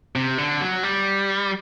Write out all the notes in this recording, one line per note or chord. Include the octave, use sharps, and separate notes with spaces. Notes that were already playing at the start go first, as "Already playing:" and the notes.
C3
D3
F#3
G3